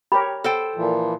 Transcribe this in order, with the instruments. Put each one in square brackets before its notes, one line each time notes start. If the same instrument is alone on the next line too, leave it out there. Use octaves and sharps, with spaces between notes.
[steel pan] G4 A#4 C#5 [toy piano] B5
[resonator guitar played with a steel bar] A4 C5 G5
[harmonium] A#2 E3 F3